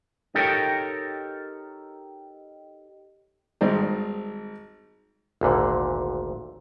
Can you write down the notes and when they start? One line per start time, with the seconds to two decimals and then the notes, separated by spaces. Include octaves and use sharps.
0.35 D#4 G4 A4 A#4 C#5 G5
3.61 G#1 G2 D#4 C5 D5
5.41 G#1 D2 A#2 D3